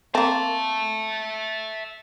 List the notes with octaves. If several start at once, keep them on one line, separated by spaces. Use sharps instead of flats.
A#3 C4 E5 A5